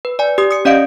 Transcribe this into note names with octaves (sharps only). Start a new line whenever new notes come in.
B4
D5 G#5
G4 D#6
D#6 C#7
C#4 D5 D#5 F5 D7